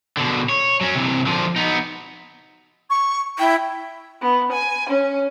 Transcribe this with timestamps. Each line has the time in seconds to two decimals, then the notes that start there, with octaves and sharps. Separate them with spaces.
0.17 B2 D3
0.49 C#5
0.81 F#3 C#4
0.95 C3 E3
1.26 D3 F3
1.56 B3 D#4
2.90 C#6
3.39 E4 G5
4.21 B3
4.50 G#5
4.87 C#4